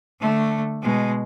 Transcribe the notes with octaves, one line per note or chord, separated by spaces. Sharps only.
D3 A3
B2 G#3